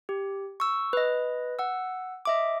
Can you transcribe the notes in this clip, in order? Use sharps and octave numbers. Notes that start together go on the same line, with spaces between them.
G4
C#6 E6
B4 D#5
F#5 E6
D#5 E5 D6